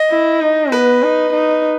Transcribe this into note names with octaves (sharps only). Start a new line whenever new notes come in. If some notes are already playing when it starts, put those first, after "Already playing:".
Already playing: D#5
E4
D#4
B3 B4
D#4
D#4